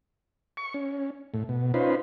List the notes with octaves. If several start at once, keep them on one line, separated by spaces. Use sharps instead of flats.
C#6
C#4
A2
B2
C#4 D#4 F4 B4 C5